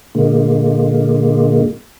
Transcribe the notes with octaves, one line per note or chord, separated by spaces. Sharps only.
A#2 D3 G#3 A#3